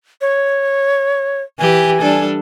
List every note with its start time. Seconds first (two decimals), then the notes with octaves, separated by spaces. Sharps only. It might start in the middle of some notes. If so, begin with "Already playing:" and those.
0.21 C#5
1.59 E3 G4 G#5
2.01 G3 D4 A4